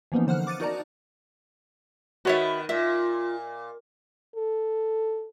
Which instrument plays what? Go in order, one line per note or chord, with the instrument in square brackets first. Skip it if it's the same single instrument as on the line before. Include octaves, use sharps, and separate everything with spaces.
[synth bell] E3 F3 A#3 B3 C#4 D#4
D3 C5 F#5 F6 F#6
D6 A6 C#7 D#7
D#4 F#4 A#4 D5 A5 A#5
[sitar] D#3 B3 [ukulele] F#4 C#5 E5
[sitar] A#2 [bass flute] F4 [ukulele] E5
[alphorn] A4